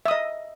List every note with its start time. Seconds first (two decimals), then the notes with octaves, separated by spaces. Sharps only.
0.06 E5
0.08 D#6
0.11 D#5